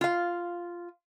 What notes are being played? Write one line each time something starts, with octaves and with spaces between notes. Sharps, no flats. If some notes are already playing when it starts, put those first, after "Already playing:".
F4 F5